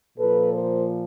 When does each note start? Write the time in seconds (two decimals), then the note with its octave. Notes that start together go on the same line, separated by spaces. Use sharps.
0.18 A#2 F3 A4 B4
0.54 A#4 C5